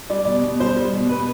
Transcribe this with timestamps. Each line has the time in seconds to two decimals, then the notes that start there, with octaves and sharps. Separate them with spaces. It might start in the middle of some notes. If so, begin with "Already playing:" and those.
0.10 G3 D5
0.25 B2 D5
0.43 B2
0.60 G3 C5
0.76 G3
0.93 B2
1.09 B2 B4